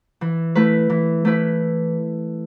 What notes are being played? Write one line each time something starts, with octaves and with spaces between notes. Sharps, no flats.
E3
A3 E4 B4
E3
A3 E4 B4